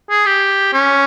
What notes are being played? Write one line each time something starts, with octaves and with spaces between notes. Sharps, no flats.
G#4
G4
C#4